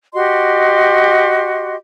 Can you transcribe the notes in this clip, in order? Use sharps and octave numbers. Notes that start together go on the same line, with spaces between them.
F#4 G4 D#5 C6